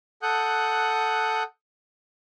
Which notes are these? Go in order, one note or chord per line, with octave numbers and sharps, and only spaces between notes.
A4 F#5 D#6 F#6 G6